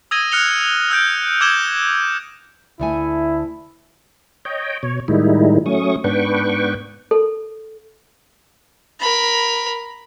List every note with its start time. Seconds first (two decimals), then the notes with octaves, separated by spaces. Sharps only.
0.11 D#6 E6 G#6 A#6 D#7 G7
0.32 F6 F#6 C#7 F7 G7
0.90 E6 F6 G6 D7
1.41 D6 E6 G#6 E7 G7
2.80 D2 A3 E4 G#5
4.45 C#5 D#5 G5
4.83 B2 C#5
5.08 A2 D#3 G3 G#3 D#4 E4
5.66 F#3 A3 C#4 C#6 D#6
6.04 G#2 B3 D4 B4 G5 C#6
7.11 A4
9.00 A#4 B5